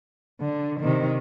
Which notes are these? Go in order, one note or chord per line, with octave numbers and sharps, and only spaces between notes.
D3
C3 D#3